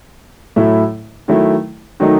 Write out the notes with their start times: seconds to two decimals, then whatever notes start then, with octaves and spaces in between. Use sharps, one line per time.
0.56 A2 F#3 A3 E4
1.28 D#3 F#3 A3 E4
2.00 D#3 F#3 A3 D#4